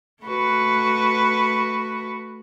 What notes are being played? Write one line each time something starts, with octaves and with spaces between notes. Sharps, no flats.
A3 F#4 B4